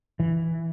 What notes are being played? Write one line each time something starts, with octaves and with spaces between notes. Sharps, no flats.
E3